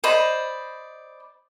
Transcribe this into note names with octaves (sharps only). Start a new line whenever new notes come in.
C5 D5 D#5 B5